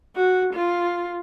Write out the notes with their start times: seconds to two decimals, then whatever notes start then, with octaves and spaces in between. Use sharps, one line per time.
0.16 F#4
0.54 F4